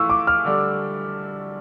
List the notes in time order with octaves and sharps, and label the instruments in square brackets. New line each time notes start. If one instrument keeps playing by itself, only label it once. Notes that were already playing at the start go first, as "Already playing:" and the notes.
Already playing: [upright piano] E3 A3 F4 [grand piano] C#6 E6
[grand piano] D6
F6
[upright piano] D3 G3 D4